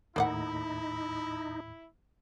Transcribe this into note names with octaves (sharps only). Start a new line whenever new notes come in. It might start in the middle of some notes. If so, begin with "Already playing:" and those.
D#2 A2 A#3 D#4 E4 D5 F#5